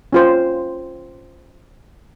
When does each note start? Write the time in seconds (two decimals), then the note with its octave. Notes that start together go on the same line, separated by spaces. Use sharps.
0.13 C#4 F4 C5